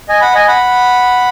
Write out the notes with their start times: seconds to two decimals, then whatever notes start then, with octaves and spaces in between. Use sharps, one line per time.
0.09 D#5 G#5
0.21 F#5 B5
0.35 D#5 G#5
0.48 F#5 B5